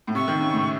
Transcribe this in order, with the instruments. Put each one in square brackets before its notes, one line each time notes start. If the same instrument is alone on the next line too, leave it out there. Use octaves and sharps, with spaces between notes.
[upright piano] A2
[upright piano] C3 [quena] C#6
[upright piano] D#3
C#3
A2